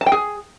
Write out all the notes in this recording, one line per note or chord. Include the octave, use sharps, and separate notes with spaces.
A5
G5
G#4